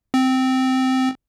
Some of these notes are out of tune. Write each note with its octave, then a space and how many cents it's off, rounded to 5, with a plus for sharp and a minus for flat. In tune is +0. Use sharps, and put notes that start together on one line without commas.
C4 -10